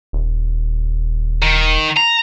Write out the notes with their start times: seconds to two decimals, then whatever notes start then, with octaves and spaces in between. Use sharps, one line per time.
0.13 D#1
1.42 D#3
1.96 A#5